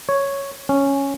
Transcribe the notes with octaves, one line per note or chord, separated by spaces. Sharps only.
C#5
C#4